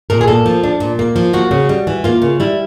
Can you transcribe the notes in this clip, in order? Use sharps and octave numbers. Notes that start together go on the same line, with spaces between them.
A#2 A#4
G#4
A#3 A4
F3
D4
A#2
A#3
F3
A#3 F#4
C#3
G3
E3
A#3 F4
C#3
G3 E4